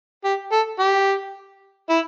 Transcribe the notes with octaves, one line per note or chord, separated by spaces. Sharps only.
G4
A4
G4
E4